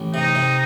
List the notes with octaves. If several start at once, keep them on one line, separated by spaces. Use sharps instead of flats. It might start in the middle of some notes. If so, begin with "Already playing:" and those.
Already playing: A1
C3 D#4
C3